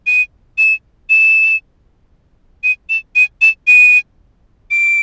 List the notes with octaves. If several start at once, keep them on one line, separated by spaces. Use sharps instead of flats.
D#7
E7
E7
D#7
E7
D#7
E7
D#7
D7